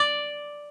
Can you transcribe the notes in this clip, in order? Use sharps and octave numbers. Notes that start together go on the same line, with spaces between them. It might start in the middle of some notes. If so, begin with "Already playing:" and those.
Already playing: D5